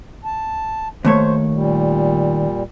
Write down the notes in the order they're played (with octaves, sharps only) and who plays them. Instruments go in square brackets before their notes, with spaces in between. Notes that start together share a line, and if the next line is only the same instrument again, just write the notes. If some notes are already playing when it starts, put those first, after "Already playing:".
[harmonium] A5
[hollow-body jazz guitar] D#2 A3 C#5 [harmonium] C5
[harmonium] A#2 G3